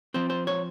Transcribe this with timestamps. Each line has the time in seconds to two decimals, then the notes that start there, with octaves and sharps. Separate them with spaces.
0.14 F3 C4 C5
0.30 C5
0.47 C#5